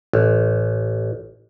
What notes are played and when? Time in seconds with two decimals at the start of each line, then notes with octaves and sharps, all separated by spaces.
0.13 A1